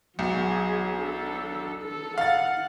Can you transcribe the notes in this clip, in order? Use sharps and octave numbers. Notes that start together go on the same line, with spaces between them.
B1 F#3 G#4
D4 A4
A4
F5 F#5 A6